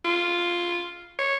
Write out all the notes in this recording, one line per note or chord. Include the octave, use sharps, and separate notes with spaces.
F4
C#5